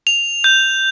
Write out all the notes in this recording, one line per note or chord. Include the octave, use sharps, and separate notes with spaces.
F7
G6